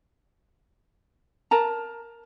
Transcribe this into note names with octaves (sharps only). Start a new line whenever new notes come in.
A#4 A5 A#5